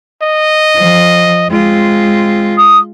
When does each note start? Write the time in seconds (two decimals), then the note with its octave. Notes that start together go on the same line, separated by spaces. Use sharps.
0.22 D#5
0.76 F3
1.50 G#3 C4 F4
2.58 D#6